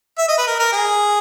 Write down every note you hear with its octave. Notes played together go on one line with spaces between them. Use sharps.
E5
D#5
B4
A#4
A#4
G#4